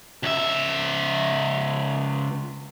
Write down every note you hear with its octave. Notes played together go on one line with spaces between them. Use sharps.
C#2 E5